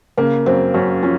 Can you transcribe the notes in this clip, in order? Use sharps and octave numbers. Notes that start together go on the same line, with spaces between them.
C#3 A#3
F#2 C4
F#2 C#4
F3 C#4